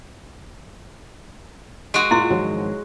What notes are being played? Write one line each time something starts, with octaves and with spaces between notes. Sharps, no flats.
G#3 F#4 D7 D#7
A#2 E4 F5 C6 D7
G#2 D#3 F3 F#3